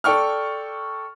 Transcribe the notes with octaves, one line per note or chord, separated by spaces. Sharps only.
A4 D5 G5 C#6 F6